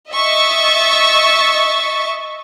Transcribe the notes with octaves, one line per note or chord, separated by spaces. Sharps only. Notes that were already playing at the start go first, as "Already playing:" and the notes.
D#5 E5 C#6 A6